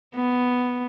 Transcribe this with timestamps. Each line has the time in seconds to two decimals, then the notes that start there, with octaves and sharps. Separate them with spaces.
0.14 B3